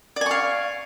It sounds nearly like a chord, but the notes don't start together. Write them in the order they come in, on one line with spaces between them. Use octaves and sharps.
D5 G#5 C#6 F5